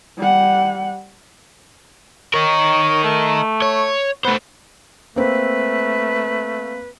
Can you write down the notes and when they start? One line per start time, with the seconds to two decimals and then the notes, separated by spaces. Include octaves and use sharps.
0.18 G3 F#5
2.34 D#4 A#4 C#5
3.04 A3
3.62 C#5
4.25 A3 B3 C5
5.16 A3 A#3 C4 B4